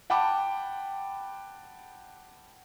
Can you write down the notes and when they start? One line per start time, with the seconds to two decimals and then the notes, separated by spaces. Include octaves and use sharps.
0.10 F#5 G5 A5 B5 D6